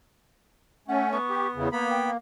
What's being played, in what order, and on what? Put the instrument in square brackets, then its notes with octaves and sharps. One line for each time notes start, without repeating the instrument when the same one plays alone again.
[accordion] A3 C#4 [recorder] F#5
[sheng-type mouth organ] B3 [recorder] C#6
[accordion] G4
E2 C#3
[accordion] A#3 [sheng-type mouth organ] B3 B5 [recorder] A#5
[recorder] G5